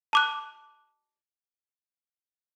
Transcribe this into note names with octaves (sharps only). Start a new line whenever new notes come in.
A5 D6 F#6